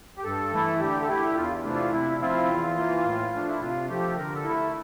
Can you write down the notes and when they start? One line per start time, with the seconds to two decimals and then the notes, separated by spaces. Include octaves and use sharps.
0.17 G4
0.24 G2 A4
0.53 E3 A3 E4
0.80 D3 G4
1.02 A4
1.08 A3 E4 G4
1.37 E2 F4
1.64 C3 E3 A3 D4
1.74 F4
1.92 C3 E4
2.21 F3 C4 E4 F4
2.48 E2
2.77 E3 A#3
3.05 A2
3.33 F3 A3 D4
3.48 E4
3.61 C3 F4
3.89 F3 A3 G4
4.17 D3 A#4
4.35 A4
4.44 E4
4.50 A3